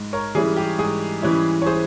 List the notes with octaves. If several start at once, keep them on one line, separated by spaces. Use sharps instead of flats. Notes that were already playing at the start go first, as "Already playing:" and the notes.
Already playing: G#2
A#4 C#5
E3 G3 C#4 E4 G#4
G4
G#2 G#4
E3 G3 C#4 E4
C#5
G#4 C5